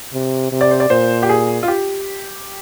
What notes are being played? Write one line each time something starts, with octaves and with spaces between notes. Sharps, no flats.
C3
C3
D5
C5
D5
A#2 C5
G4
G#4
F4
G4